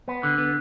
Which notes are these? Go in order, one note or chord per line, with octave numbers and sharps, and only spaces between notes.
B3
D3
B3